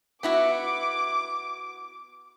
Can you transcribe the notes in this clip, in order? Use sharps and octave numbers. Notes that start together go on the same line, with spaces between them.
B3 E4 F#4 D6